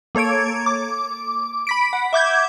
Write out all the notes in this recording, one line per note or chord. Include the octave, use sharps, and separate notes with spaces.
A#3 A4 C#5 G#6 D7
D6
B5 B6 D7
F#5
E5 D6 G6 G#6